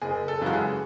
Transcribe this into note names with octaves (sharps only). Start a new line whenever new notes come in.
F#1 G#4
A4
F#2 C#3 E3 G#3 F#4
G#4